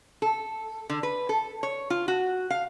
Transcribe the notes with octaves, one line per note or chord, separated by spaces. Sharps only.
A4
D3
B4
A4
C#5
F4
F#4
F5